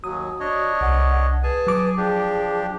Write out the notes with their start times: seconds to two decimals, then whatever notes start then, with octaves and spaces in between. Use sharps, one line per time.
0.04 D#2 F#3 F#4 D#6
0.40 D4 C#5 D#5
0.81 C2 F#5
1.43 G#4 B4 G#5 A5
1.67 F#3 D6
1.97 F3 D4 G4 G#4